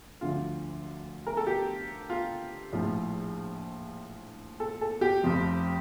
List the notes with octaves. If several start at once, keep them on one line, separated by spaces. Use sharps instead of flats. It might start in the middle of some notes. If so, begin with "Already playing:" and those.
D2 D3 F3 F4
A#4
A4
G4
F4
A#1 A2 F3
A4
A4
G4
F1 F2 C3 F3